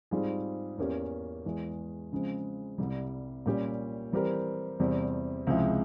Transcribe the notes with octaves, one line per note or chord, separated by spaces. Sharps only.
G#2 G3 C4 F4 G#4
E2 E3 A#3 C#4 G4
E2 E3 G#3
C#3 F3 G#3 C4
C2 C3 G3
A#2 G3 C#4 G4
E3 G3 C4 G4 A#4
E2 C3 G3 C4
C#2 C3 F3 G#3 E4